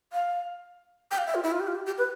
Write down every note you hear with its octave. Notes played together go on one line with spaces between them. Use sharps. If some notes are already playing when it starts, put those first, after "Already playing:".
F5
G5
F5
E5
F4
E4
F4
G4
F4
G4
G4
B4